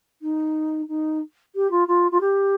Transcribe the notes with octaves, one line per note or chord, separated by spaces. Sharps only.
D#4
D#4
G4
F4
F4
F4
G4